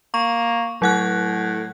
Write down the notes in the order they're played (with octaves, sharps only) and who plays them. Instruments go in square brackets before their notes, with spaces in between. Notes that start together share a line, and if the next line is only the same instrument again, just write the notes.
[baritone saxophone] A#3 [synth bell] C#6
[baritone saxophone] A2 [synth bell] F#3 F#5 F#6